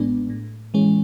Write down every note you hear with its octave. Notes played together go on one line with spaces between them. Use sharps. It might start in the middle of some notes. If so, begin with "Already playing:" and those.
Already playing: A1 A2 G#3 B3 D4
A2
E3 G#3 C#4